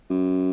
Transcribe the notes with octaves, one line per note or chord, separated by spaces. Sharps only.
F#2